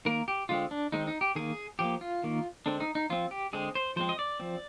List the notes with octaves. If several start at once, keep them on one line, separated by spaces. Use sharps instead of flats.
D#3 A#3 A#4
G4
D3 G#3 C4 F4
D4
D#3 G#3 C4 D#4
D#4
G4
D#3 A#3 G#4
F3 A#3 G4
F4
D#3 A#3
D3 G#3 C4 D4
D#4
D#4
F3 C4 F4
G4
D3 G#3 C4 G#4
C5
F3 G#3 C4 C5
D#5
D5
F3 C4